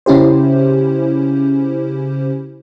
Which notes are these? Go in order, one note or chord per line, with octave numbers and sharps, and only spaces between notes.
C#3 C#4 E4 G4 C5